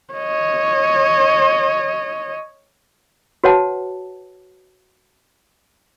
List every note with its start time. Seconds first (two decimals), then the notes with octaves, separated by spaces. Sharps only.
0.14 C#5 D#5
3.44 F#4 B4 C#5 F#5 A5